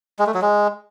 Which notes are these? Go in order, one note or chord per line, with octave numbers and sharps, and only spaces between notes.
G#3
A3
F#3
G#3